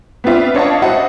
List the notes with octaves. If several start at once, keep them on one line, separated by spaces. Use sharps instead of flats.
B3 C4 D4 F4 E5
D4 C#5 D#5 F5 A5
E4 F#4 C5 D#5 F#5